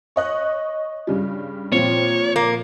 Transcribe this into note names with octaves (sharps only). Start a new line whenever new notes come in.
C#5 D#5 F#6
G2 C#3 G3
A#2 F3 C4 F4 C#5
A#3